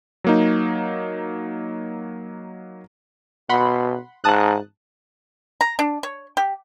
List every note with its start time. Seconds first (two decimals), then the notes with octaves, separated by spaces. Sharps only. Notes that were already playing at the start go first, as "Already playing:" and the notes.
0.24 F#3 A#3 D#4
3.49 B2 F#5 B5 C6
4.24 G#2 A5 D#6 F#6
5.61 A#5
5.79 D4
6.03 C#5
6.37 G4